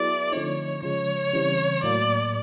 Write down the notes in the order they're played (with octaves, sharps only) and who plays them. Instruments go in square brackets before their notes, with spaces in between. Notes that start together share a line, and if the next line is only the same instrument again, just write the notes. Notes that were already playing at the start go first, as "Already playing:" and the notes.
Already playing: [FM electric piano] F#3 B3 E4 G#4 [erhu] D5
[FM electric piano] D3 F3 A3 C4 D#4 [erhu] C#5
[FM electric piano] C#3 F3 G#3 [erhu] C#5
[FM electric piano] C#3 E3 G3 C4
[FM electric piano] A2 F#3 A#3 [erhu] D5